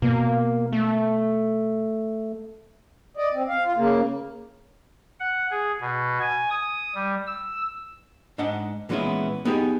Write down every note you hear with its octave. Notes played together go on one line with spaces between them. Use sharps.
B2 A#3
A3
D5 D#5
C4
F5
F4
C#3 A#3
F#5
G#4
B2
G#5
D#6
G3
E6
G#2 D4 D#5 F#5 A5
A#2 E3 G#3 B3 C#4 E4
B3 D#4 G4 G#4